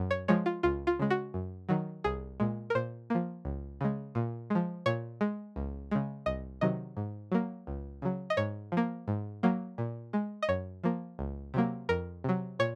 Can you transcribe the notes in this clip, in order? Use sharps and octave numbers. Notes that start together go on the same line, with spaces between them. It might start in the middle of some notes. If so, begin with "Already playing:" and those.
Already playing: F#2
C#5
F3 G#3 C#5
F4
C#2 F4
F4
C#3 G#3
F#4
F#2
D#3 F#3
C2 G#4
A#2 G#3
A#4
A#2 C5
F3 A#3
C#2
C#3 G#3
A#2
F3 G#3
A#2 C#5
G#3
C#2
C#3 G#3
C2 D#5
C3 D#3 F#3 D#5
G#2
F#3 A#3
C#2
C#3 F#3
D#5
G#2 C#5
F3
A#3
G#2
F#3 A#3
A#2
G#3
D#5
F#2 C#5
F3 A#3
C#2
C3 F#3 A#3
F2 A#4
C3 F#3
A#2 C#5